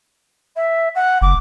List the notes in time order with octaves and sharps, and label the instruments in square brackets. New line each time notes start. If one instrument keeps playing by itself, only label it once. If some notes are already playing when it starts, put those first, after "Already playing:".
[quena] E5
F#5
[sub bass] F#1 [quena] D6